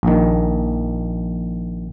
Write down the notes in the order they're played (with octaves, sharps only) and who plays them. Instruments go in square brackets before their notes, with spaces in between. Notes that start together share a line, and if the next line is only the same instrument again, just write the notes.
[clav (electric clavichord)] A#1 D#3